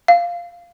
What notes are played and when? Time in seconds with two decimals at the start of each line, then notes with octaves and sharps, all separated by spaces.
0.08 F5